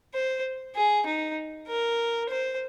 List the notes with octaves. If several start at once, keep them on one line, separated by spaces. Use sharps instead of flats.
C5
G#4
D#4
A#4
C5